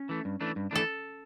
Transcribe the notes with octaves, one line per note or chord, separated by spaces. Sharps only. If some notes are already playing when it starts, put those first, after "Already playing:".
Already playing: C#4
E3 A3
G2
E3 A3 D4
G2
E3 A3 D4 A4